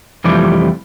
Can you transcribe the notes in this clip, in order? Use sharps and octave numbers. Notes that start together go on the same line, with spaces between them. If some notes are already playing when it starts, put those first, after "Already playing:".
F2 C3 E3 F3 G3 A3